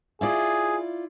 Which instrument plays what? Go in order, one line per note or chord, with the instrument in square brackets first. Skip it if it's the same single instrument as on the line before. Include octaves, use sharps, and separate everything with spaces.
[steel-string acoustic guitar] E4 F4 D5 [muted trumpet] G#4